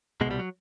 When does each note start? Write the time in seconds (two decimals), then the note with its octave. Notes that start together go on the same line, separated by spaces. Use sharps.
0.21 B2 G#3
0.26 C2 G3
0.39 F#3